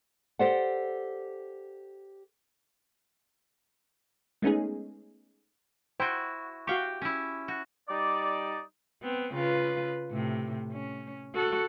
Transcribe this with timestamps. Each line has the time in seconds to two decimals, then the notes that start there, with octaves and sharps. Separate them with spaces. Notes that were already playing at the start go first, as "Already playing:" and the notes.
0.39 G4 A4 C5 D5 F#5
4.42 G#3 A3 B3 C#4 D#4 G#4
6.00 E4 F#4 C5 G5
6.67 F#4 G4 F5 G5 C#6
7.01 C#4 E4
7.48 F#4
7.88 G3 D#4 D5
9.02 B3 C4
9.34 C#3 F4 B4
10.10 A2 C3
10.72 C#4
11.34 F#4 A4